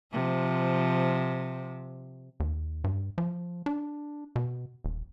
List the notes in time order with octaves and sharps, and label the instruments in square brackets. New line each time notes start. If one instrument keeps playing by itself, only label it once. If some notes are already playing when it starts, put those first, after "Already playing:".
[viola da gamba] C3 F3
[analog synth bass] D#2
G2
F3
D4
B2
D#1